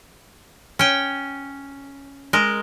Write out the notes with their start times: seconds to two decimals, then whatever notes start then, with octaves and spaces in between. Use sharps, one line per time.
0.79 C#4 G5
2.33 G#3 A#4